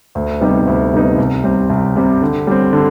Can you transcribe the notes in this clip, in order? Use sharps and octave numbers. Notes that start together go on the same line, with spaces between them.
D2
C3 G3 B3 D#4
D2
C3 G3 B3 D#4
C2
C3 G3 C4
C2
C3 G3 C4
D3
G3 C4
D3